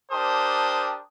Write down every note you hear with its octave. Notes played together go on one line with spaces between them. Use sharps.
D4 G4 A#4 C5 A5 D#6